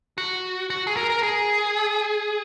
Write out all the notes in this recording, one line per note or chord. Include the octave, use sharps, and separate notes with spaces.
F#4
F#4
G#4
A#4
A#4
G#4